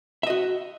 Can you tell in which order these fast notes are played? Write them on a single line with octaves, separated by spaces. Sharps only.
E5 D#5 F#4